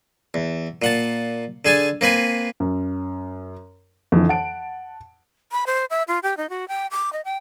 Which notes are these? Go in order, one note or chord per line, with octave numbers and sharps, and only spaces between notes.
E2
A#2 F#5 A5
D3 G#4 G#5 A5
A#3 C4 B4 G#5
F#2
F2 D3 E3
F#5 A5 D7
B5
C5
E5
F4
G4
D#4
F#4
G5
D6
D#5
G5